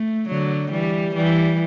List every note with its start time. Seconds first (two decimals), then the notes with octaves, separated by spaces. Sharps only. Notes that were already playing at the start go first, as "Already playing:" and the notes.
Already playing: A3
0.29 D3 F#3
0.72 E3 G3
1.15 E3 G3